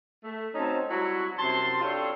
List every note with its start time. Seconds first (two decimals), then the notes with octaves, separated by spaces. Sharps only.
0.24 A3
0.55 F#3 C4 C#4 D#4 A5
0.90 F#3 G3 E4 F#4
1.39 F#2 C3 A5 C6
1.81 C4 D4 F4 G4 A4 C#5